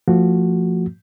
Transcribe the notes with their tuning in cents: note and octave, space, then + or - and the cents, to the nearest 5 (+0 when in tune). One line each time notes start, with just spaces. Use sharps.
F3 +0 A3 +40 F#4 +0